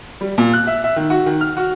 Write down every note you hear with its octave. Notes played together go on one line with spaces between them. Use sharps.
G3
A#2
F#6
E5
E5
D#3
F#4
D#3
F6
F#4